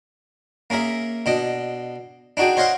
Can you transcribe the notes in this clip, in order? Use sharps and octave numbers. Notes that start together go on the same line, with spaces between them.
A#3 C#4 G#4 A#4 E5
B2 D4 D#5
D4 D#4 F#4 G#4 G5
C5 C#5 D#5 F5 F#5 C6